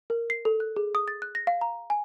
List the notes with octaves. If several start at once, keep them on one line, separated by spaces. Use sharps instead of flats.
A#4
C7
A4
F#6
G#4
D#6
A6
F#6
A#6
F5
A#5
G#5